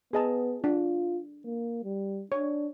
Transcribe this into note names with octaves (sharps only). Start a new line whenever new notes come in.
B3 G#4 D#5 A5
D4 F4
A#3
G3
D4 C#5